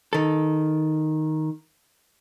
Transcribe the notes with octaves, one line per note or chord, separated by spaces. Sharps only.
D#3 A4